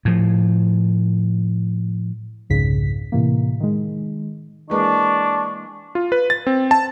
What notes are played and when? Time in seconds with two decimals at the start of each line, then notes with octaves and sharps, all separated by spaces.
0.05 A2 F3
2.50 C2 F2 G#2 C#3 B6
3.12 A2 C3 E3 A#3
3.60 D#3 G#3
4.70 E3 G#3 A#3 D4 C#6
5.95 F4
6.12 B4
6.30 A6
6.47 C4
6.71 A5